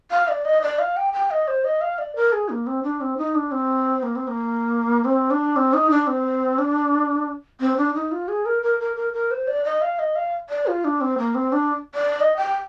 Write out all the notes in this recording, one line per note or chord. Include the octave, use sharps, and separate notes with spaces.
F5
D5
D#5
D5
F5
G5
G5
D#5
C5
D#5
F5
D5
A#4
G#4
A#3
C4
D4
C4
D#4
D4
C4
A#3
C4
A#3
C4
D4
C4
D#4
D4
C4
D4
C4
D4
D#4
F4
G#4
A#4
A#4
A#4
A#4
A#4
C5
D5
D#5
F5
D#5
F5
D5
F4
D4
C4
A#3
C4
D4
D5
D#5
G5